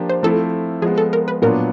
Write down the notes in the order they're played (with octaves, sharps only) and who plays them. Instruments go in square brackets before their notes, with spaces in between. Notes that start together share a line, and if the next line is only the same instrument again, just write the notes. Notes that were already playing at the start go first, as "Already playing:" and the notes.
Already playing: [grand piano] F3 A#3 D4 G4
[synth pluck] C5
[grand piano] F3 A3 C4 E4 [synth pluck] A4
[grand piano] F3 G#3 B3 [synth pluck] G#4
[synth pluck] A4
A#4
B4
[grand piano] A#2 F#3 B3 D4 F4 [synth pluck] A#4